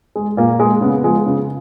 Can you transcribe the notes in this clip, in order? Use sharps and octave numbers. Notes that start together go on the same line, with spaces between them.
G#3
A#2 A#3
G#3
C#3 B3
F3 G#3
C#3